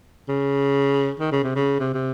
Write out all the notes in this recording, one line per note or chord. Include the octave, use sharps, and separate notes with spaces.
C#3
D#3
C#3
C3
C#3
C3
C3